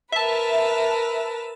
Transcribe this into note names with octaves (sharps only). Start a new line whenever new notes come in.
A#4 B4 E5 A5